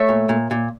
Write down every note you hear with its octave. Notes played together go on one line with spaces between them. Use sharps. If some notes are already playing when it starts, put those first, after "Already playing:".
Already playing: A3 C#5 E5
A#2
A#2
A#2